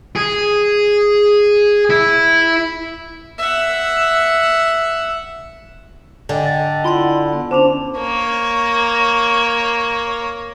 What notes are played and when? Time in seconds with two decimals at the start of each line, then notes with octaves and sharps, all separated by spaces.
0.16 G#4
1.90 E4
3.38 E5 F#5
6.29 D3 D#5 G5 G#5
6.46 A6
6.84 E4 F4 D5 F#5 B5 C6
7.32 B3
7.51 C#4 D4 C5 A5 D6
7.97 A#3 C#5